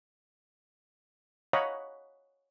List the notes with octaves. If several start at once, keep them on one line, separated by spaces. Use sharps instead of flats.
C#5 D#5 F5 F#5 A#5 B5